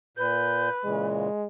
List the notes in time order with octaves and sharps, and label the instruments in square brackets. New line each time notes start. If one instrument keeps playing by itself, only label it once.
[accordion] A#2 G6 [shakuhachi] B4
[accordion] A#2 C#3 E3 [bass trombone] G#3